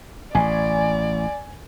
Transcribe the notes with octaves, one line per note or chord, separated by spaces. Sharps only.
A1 D5 G#5